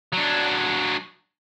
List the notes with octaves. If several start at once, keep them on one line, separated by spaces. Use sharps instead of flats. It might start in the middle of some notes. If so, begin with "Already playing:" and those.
F#3 D4